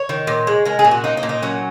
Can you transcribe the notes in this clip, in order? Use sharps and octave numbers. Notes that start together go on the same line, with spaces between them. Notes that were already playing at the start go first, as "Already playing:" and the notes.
Already playing: C#5
D#3
A#2
G#3
G#3 A#4
G#4
A#2
F#4
A#3 D#4
D#4
A#2
D#4
F#3 C#4